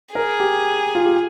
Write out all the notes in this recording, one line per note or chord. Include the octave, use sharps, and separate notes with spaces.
G#4 A#4
G4
F4
G4